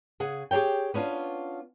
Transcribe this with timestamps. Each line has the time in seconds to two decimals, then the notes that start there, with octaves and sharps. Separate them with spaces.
0.20 C#3 G#4 F#5
0.51 G4 G#4 A#4 C#5 G5
0.94 B3 C#4 D4 F4